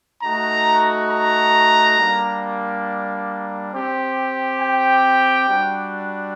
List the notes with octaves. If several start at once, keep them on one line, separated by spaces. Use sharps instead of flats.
A3 D#4 F#4 A#5
A#5
G3 A#3 D4
C4 G4
G5
G3 D4 F#4